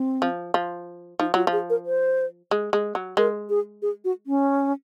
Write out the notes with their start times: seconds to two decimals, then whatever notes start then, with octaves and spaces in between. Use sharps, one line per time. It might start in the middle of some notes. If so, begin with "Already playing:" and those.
Already playing: C4
0.22 F3
0.54 F3
1.19 F3 D#4
1.34 F#3 F4
1.47 F3
1.53 G#4
1.70 A#4
1.86 C5
2.51 G#3
2.73 G#3
2.95 F#3
3.17 G#3 A#4
3.49 G#4
3.82 G#4
4.05 F#4
4.27 C#4